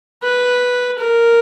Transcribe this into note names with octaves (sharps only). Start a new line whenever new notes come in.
B4
A#4